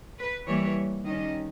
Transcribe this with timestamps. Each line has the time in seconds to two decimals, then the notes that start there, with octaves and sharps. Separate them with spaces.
0.19 B4
0.47 E3 G3 A#3 C#5
1.04 D#3 G3 C#4 D#5